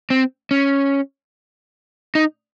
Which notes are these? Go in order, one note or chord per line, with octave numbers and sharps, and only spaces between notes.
C4
C#4
D#4